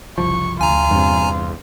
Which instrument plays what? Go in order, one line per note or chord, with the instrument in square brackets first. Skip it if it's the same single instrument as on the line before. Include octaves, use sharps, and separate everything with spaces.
[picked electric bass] F#1 C2 F3 [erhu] C#6
[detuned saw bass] D2 [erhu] F4 [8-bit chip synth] G#5 A#5
[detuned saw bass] E2 [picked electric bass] G2 C3